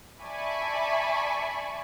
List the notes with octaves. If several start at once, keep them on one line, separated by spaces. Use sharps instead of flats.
D5 E5 G#5 A5 B5 C#6